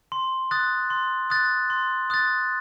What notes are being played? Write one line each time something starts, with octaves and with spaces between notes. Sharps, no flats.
C6
D#6 F#6 A6
C6
D#6 F#6 A6
C6
D#6 F#6 A6